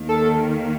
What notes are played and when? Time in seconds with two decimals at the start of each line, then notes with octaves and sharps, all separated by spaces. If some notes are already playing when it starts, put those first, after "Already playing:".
Already playing: D#2 D#3 A#3
0.09 A4